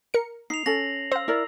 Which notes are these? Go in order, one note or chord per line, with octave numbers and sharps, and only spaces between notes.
A#4 C#7
D#4 C7 F7
C#4 A4 A#6 F#7
C5 F5 E6
E4 A#4 D5